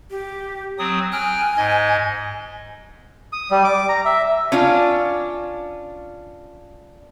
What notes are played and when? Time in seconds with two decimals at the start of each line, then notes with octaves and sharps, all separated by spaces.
0.10 G4
0.79 F#3 C4 A#5 D#6
1.13 G5 G#5 F6 F#6
1.57 G#2 D#5 G#6
3.33 D#6
3.51 G3
3.64 D6
3.89 A#5
4.05 E5
4.52 C#4 D4 F4